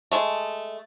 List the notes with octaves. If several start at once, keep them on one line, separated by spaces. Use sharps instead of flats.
G#3 A3